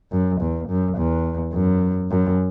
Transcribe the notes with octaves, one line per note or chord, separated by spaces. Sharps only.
F#2
E2
F#2
E2
F#2
F#2